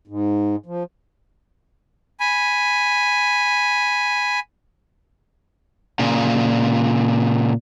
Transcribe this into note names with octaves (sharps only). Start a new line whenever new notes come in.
G#2
F3
G#5 B5
A#2 C#3